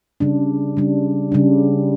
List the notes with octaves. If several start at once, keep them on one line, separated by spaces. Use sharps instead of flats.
C#3 G3 D4
C#3 G3 D4
C#3 G3 D4